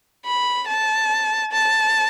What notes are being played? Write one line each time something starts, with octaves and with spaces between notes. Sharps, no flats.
B5
A5
A5